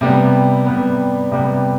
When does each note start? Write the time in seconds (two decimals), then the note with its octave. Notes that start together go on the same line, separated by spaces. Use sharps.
0.01 C3 G3 B3
0.66 C3 G3 B3
1.31 C3 G3 B3